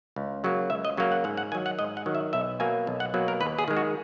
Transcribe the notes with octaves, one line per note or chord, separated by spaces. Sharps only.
C#2
C#3 F#3 A#3
C#2 E5
D#5
C#3 F#3 A#3
F#5
G#2 F#5
F#5
D#3 F#3 G#5
F#5
G#2 D#5
F#5
D#3 F#3
E5
B1 E5
B2 F#3 A#3 G#5
B1
F#5
B2 F#3 A#3
A#4
D#2 B4
G#4
D#3 G#3
F#4